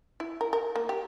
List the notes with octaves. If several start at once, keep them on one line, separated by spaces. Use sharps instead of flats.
E4
A#4
A#4
A#3
G4